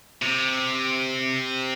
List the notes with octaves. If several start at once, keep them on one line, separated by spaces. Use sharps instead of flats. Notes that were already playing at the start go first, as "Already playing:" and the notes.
C3